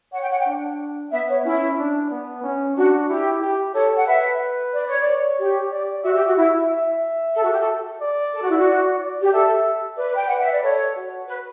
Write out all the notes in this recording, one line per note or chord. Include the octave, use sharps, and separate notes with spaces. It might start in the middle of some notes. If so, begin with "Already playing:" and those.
C#5 F#5
G5
F#5
G5
D4
B3 E5
C#5
C#4 E4
D4
B3
C#4
D4 F#4
E4 G4
G4
A4 C#5
F#5
B4 E5
D5
C#5
D5
C#5
G4
D5
F#4 E5
G4
F#4
E4 E5
E5
A4
F#4
G4
A4
D5
A4
F#4
E4
F#4
D5
D5
G4
A4 E5
B4 D5
G5
B4 F#5
E5
D5
A4 C#5
F#4
B4